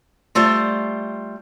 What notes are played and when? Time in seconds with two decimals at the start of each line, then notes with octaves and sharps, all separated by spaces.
0.35 G3 A3 F4 C5